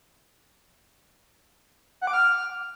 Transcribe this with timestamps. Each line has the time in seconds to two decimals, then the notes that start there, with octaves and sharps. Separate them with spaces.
2.01 F#5
2.07 D6
2.13 F6